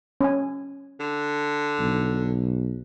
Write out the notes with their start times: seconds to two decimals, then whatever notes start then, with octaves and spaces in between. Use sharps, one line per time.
0.21 C#4 G#5
1.00 D3
1.79 B1